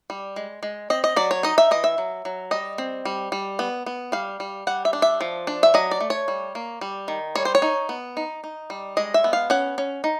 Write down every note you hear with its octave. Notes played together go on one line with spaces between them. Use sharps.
G3
G#3
G#3
C4 D#5
D#5
F#3 D5
C#5
D#4 D#5
E5
E3 D#5
E5
F#3
F#3
G3 D#5
C4
G3
G3
B3
B3
G3 F5
G3
G3 F#5
E5
D4
E5
F3
D4
E5
F#3 D#5
D5
A3
C#5
G3
A#3
G3
D#3
G3 C#5
C5
C#5
D#4
B3
D#4
D#4
G3
G#3 D#5
E5
B3
F5
C#4 F#5
C#4
D#4